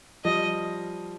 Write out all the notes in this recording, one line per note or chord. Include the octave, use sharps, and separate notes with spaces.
F3 G3 D#5